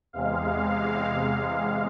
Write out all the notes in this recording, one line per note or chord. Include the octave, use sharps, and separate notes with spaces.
E2 C3 G#3 F5